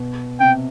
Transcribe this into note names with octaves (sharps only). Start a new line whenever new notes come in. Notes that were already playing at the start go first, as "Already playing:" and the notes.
Already playing: B2
C3 G5